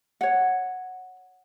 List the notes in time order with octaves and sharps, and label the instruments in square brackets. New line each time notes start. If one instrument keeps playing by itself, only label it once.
[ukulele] C#5 F#5